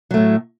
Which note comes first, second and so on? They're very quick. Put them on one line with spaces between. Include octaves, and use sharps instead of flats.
F#3 A3 A2